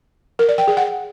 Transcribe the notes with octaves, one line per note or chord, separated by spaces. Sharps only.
A#4
D5
G5
G#4
F#5